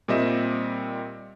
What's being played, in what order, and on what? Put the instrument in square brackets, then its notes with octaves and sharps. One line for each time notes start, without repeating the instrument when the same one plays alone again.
[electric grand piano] A#2 G3 C4 D#5 E5 E7